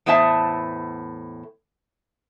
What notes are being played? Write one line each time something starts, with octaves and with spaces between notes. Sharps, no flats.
E2 A2 B3 C5 E5 A5